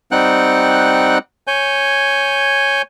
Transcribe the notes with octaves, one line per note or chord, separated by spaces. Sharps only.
G3 C4 D#4 F#5 G5 F#6
C#5 G#5 G6